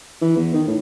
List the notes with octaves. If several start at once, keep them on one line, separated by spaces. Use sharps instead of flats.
E3
E2
D#3
A2